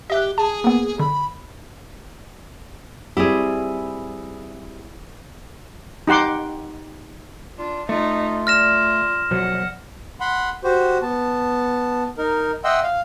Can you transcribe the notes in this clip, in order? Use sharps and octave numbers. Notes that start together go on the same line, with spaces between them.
G4 D#5 E5 F#6
G#4 A5
A#3 B3
D3 B5
G3 C4 E4 G4 G#4
D#4 G4 F#5 C6 D6
D4 F4
A3 D#4 F4
D5 F6 A#6 E7
B2 F3 F#3 F#5
F#5 B5 C6
F#4 G4 C5
B3 A5
D#4 A#4
D#5 E5 F#5 G5 C6 E6
F5